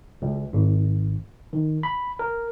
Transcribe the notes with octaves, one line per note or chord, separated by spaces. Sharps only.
C#2
G#1
D#3
B5
A#4